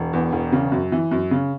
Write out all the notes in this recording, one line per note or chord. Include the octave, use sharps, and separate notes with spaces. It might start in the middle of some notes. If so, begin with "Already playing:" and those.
Already playing: E1
E2
E1
C#3
F#2
E3
F#2
C#3